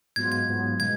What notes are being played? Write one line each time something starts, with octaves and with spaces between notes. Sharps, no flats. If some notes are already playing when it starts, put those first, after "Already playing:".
G#2 F#3 B3 F4 G#6
G#6
G#2 F#3 B3 F4
B2 G#3 G#6